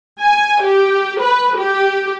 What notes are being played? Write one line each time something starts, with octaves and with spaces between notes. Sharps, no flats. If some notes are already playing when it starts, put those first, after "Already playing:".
G#5
G4
B4
G4